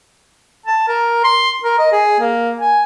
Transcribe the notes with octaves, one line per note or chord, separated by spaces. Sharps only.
A5
A#4
C6
A#4
D#5
G#4
A#3
G#5